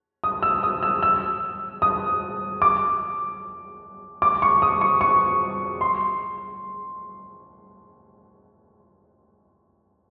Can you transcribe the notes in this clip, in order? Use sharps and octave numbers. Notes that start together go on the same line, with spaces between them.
D#6
E6
D#6
E6
E6
D#6
D6
D6
C#6
D#6
C#6
C#6
C6